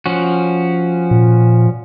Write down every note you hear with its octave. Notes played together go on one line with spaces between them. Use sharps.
F3 C#4 F#4
A#2